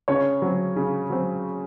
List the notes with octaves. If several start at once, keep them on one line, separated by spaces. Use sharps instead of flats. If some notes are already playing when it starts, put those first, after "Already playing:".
C#3 C#4 C#5
F#3 C4
C#3
F#3 C4